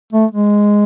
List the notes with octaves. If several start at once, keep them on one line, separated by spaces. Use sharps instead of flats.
A3
G#3